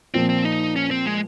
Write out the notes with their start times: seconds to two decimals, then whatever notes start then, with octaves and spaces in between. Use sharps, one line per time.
0.14 A#2 F3 A#3 C4
0.29 C4
0.45 D#4
0.76 C#4
0.91 C4
1.06 G#3